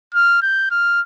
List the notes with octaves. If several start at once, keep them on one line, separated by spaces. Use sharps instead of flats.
F6
G6
F6